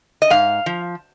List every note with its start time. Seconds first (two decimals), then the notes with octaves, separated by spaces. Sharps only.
0.22 D#5
0.30 G#2 F5
0.66 F3